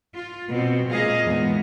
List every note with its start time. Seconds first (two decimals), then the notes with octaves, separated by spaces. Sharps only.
0.14 F4
0.50 B2 C4
0.90 A#2 G#3 G#4 D#5 F5
1.26 E2 G#2 G#3 B3